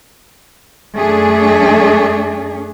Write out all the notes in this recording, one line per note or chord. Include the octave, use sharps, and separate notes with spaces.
F#2 A3 D4 G#4